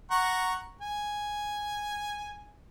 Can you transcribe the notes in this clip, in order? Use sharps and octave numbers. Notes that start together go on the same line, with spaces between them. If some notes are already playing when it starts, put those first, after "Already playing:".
F#5 A#5 C#6
G#5